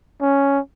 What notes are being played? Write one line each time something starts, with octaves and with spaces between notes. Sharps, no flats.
C#4